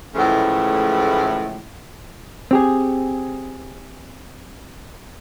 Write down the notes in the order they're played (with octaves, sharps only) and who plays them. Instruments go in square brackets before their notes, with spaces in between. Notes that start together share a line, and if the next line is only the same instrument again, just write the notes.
[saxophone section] A2 C#3 E3 F3 G#3 A3
[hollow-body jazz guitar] C4 G4 G#4